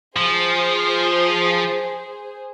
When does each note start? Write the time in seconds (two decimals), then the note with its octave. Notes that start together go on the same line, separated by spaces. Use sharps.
0.17 F3 G#4 C5